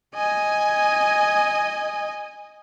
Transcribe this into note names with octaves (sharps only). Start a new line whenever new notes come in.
D#5 G#5